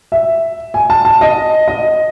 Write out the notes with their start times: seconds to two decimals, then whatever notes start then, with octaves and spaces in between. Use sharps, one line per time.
0.12 E5
0.74 G#5
0.90 A5
1.05 A5
1.21 D#5
1.68 D#5